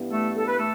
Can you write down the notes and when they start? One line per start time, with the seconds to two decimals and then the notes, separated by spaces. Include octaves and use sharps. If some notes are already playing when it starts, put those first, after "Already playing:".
Already playing: G2 E3 B3
0.10 A3 A4
0.36 A4
0.47 B4
0.58 A3 A4